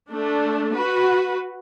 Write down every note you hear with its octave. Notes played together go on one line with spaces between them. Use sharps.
A3 D4
F#4 B4